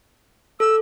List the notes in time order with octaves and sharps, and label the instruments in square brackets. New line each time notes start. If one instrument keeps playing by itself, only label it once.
[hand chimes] A4 [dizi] E6